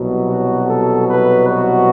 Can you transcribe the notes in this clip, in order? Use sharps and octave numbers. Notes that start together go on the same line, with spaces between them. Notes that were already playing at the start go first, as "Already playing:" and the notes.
Already playing: C2 B2 F#3
F#4
A4
B4
F#4